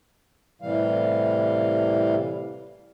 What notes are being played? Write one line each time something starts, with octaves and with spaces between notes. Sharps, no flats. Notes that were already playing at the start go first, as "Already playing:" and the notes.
A2 C3 E3 G3 F5